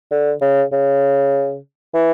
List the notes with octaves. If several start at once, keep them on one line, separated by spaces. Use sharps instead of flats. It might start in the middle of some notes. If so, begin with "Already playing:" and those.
D3
C#3
C#3
E3